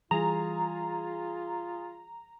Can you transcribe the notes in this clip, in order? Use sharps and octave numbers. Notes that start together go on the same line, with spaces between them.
E3 G3 F4 G#4 A#5